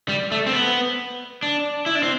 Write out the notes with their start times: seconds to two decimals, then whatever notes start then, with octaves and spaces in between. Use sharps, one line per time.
0.09 G3
0.32 A3
0.47 C4
0.53 B3
1.43 D4
1.86 E4
1.95 D4
2.03 C4